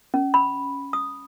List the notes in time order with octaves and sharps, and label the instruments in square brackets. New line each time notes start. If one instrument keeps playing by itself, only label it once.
[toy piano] C#4
B5
D#6